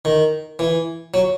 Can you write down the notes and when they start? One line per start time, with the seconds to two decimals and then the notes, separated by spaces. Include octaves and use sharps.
0.05 D#3
0.59 E3
1.14 F#3